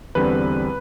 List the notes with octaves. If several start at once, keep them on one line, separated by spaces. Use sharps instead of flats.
E2 D3 G3 C4 B4